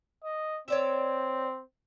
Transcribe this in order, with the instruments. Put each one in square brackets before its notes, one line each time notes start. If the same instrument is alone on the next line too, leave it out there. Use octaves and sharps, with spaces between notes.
[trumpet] D#5
[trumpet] C4 [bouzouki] C#5 D5 E5